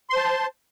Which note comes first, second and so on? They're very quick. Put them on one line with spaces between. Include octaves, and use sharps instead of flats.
C6 C5 A5